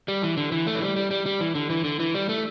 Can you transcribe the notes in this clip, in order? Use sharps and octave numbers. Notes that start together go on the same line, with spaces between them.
G3
E3
D3
E3
A3
E3
G3
G3
G3
G3
E3
D3
E3
D3
E3
G3
A3